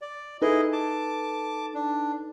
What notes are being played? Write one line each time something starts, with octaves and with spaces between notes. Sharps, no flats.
D5
D#4 E4 G#4 A4 B4 D#5
A5 D6
D4